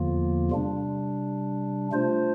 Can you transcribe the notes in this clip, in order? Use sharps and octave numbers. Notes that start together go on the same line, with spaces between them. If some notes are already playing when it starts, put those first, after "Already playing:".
Already playing: E2 D3 F3 A#3 F4
C3 G3 D4
A3 D4 F4 C5